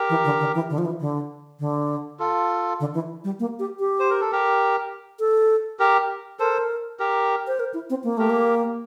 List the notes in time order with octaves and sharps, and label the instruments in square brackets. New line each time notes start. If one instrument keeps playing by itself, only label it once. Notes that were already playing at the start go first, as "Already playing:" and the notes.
Already playing: [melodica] G4 A#4
[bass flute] E3
D3
D3
E3
D3
F3
E3
D3
D3
[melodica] F4 A4
[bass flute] D3
E3
G3
A#3
G4
G4
[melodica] C5
A#4
A4
G4 A#4
[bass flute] A4
[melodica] G4 A#4
[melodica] A4 C5 [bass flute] A#4
[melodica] G4 A#4
[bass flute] C5
A#4
E4
C4
A#3
[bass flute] A3 [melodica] G4 A#4
[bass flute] A#3